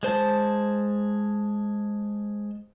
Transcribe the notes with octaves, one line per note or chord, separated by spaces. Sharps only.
G#3 C5 A5